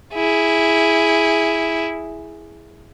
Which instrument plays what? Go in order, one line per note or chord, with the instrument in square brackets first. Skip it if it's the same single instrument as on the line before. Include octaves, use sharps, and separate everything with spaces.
[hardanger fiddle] E4 G#4